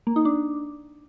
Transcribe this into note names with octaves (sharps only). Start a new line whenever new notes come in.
A#3
D#4
D4